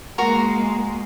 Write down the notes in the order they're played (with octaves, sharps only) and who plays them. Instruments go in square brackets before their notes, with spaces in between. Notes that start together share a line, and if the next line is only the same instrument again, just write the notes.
[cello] G#3 A#3 [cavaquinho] F#4 A#4 A#5